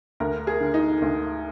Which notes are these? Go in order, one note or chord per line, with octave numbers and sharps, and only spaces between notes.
D2 A#4
G#4
D3
D#4
D2